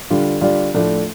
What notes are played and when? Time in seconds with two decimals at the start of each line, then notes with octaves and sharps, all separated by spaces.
0.10 D3 G3 D4 F4
0.41 D3 G3 D4 F4
0.74 A2 F3 A3 D4